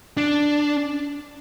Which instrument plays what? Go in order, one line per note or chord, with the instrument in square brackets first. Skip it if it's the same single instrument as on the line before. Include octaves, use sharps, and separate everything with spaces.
[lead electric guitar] D4